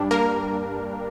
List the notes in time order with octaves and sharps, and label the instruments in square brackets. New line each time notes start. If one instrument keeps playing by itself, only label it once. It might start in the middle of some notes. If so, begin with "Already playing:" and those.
Already playing: [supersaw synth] G2 G3 D4
A#3 A#4